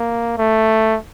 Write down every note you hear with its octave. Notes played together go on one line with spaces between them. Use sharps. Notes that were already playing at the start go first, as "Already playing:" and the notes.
Already playing: A#3
A3